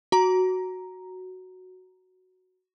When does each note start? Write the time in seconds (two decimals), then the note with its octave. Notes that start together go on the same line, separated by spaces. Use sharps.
0.12 F#4 A#5